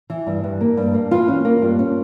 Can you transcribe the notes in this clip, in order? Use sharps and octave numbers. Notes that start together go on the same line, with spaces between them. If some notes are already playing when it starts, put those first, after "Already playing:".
E3
G2
G2
A#3
G2
A#3
E3 F4
C#4
A#3
G2
C#4